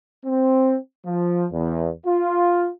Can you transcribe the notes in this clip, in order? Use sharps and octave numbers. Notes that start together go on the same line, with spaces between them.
C4
F3
E2
F4